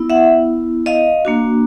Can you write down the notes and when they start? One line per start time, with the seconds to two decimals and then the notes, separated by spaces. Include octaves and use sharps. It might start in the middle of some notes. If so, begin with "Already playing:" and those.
Already playing: B3 E4
0.10 E5 F#5
0.86 D#5 F5
1.25 A#3 D4 F#4